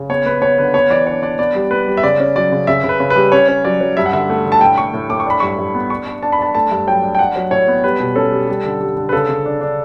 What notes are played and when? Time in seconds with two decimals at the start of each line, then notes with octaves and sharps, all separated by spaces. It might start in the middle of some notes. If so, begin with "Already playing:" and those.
Already playing: C#3
0.10 B3 C#5
0.26 B3 B4
0.42 B3 C#5
0.58 D3 B4
0.74 B3 C#5
0.90 E3 D5
1.07 D4 C#5
1.23 D4 D5
1.39 B3 D5
1.55 G3
1.71 B3 B4
1.87 G3
1.97 E5
2.03 C#3 D5
2.20 C#4
2.36 F#3 D5
2.52 C#3
2.67 C#3 E5
2.84 C#3
2.89 B4
3.00 C#3
3.10 B4
3.16 G3
3.32 C#4 C#5
3.48 C#4
3.64 F#3 D5
3.81 F#3
3.97 G2 E5
4.06 F#5
4.13 D3 E5
4.29 A3
4.45 D3
4.52 A5
4.61 A2 G5
4.78 A2 C#6
4.93 A2
5.09 A2 D6
5.20 C#6
5.26 D4 B5
5.40 G2 C#6
5.58 G2
5.75 B3
5.90 D4 C#6
6.07 D4
6.23 D4 A5
6.32 B5
6.39 D4 A5
6.55 A3 A5
6.71 G2
6.87 F#3 G5
7.03 D4
7.15 G5
7.19 D4 F#5
7.36 F#3
7.51 A2 C#5
7.68 B3
7.84 G3 B4
8.00 B2
8.16 C#4 A4
8.32 G3
8.48 G3
8.65 D3
8.80 G3
8.97 D3
9.09 B4
9.13 C#3 A4
9.29 C#3
9.46 D4
9.61 D4